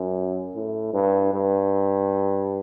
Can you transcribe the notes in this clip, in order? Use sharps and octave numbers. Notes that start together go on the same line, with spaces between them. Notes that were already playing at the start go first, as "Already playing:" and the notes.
Already playing: F#2
A2
G2
G2